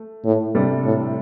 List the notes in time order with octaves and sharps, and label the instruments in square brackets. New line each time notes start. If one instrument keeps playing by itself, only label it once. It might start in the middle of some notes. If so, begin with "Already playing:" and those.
Already playing: [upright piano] A3
[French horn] A2
[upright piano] C3 G3 D4 A4
[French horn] A2